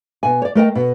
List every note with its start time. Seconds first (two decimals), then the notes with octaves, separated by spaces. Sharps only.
0.23 B2 G#5
0.42 C#5 D5
0.55 A3 A#4 D#5 G5
0.75 B2